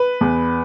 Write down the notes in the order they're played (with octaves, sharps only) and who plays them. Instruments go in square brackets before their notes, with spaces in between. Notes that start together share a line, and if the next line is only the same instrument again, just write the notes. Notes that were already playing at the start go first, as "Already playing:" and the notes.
Already playing: [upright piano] B4
E2